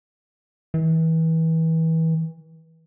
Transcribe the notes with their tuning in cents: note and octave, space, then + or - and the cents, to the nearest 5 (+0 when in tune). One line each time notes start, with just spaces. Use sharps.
E3 -30